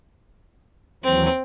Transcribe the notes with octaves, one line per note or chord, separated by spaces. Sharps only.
D#2 E3 F#3 C4